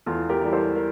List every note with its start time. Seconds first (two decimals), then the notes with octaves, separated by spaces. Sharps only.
0.06 E2 F4 A4
0.29 G4 A#4
0.42 E3 G3
0.53 A4 C5
0.76 A#4